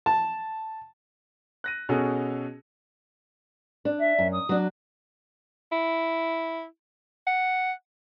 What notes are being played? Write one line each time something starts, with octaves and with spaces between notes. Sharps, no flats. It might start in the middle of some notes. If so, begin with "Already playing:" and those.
A5
F#6 A#6 D#7
B2 C#4 F#4 G#4 A4
D4
E5
F#2
D#6
F#3 D4
E4
F#5